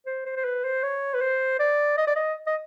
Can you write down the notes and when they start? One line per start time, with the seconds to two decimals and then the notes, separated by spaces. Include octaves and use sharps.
0.06 C5
0.26 C5
0.36 C5
0.44 B4
0.64 C5
0.83 C#5
1.14 B4
1.21 C5
1.59 D5
1.98 D#5
2.07 D5
2.16 D#5
2.47 D#5